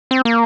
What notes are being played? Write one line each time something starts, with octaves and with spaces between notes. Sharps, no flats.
C4
A#3